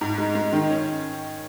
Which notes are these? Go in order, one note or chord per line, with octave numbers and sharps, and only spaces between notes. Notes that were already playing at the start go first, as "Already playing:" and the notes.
G#2
G#3
G#3
D#3
C#4